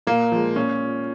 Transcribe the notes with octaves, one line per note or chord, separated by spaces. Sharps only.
A#2 A#3
F3 G#3
A#2 C#4